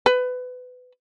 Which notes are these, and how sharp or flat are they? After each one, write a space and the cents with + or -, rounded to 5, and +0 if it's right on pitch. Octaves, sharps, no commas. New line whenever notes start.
B4 +25